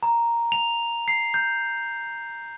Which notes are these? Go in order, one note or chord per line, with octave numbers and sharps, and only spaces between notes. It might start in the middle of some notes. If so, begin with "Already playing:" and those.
A#5
F7
C7
G6